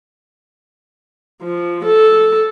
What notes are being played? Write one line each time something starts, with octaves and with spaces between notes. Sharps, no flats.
F3
A4